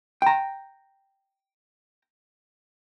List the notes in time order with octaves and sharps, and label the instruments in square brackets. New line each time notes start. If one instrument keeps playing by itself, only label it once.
[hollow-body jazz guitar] G5 A#5